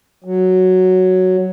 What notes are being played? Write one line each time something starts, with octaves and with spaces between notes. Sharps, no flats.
F#3